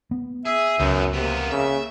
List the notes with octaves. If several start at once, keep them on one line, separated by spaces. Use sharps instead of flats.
B3
G#4 E5
C#2 F#2 B3 D#4
F2 C3 A#3 B3
C#3 E5